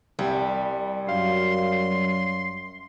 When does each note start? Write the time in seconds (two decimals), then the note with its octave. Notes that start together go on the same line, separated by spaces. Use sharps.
0.19 C2 G3
1.09 F#2 F5 C6